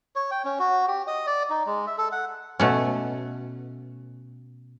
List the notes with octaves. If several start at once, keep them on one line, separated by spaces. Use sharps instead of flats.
C#5
G5
C#4
F#4
G4
D#5
D5
D#4
G#3
E5
A4
F#5
B2 A3 C#4